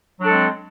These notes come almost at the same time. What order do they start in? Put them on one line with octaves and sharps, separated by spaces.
F#3 D4 A4 G#3 C4